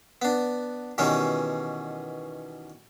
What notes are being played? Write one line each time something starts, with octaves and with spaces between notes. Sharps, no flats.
B3 D4
B2 D#3 E3 G3 C#4